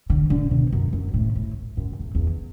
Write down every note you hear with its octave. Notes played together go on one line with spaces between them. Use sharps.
D3
D3
B2
F#2
F#2
A2
A2
F#2
E2
E2